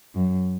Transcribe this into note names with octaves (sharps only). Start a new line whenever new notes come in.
F#2